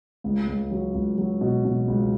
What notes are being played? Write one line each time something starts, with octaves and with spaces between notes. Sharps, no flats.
C#2
C#2
F#3
C#2
F#3
B2
B2
C#2